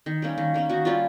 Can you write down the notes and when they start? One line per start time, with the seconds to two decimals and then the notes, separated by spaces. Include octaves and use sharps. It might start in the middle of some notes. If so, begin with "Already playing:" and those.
0.06 D#3
0.22 G3 A#3 C#4
0.38 D#3
0.54 G3 A#3 C#4
0.69 D#3 F#4
0.85 G3 A#3 C#4 F4